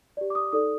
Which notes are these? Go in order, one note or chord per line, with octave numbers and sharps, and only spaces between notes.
G4 D5
D6
D#6
D#4 A4 D5 D#6